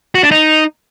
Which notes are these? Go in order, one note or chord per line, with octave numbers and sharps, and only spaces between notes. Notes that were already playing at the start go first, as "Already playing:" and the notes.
F#4
D4
D#4